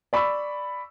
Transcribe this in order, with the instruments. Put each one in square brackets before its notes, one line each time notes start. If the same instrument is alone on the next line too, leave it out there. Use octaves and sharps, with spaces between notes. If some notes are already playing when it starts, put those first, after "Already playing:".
[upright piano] D5 B5 C#6 E6